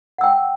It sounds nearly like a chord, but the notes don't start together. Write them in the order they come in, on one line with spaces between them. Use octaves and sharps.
F#5 E6 G5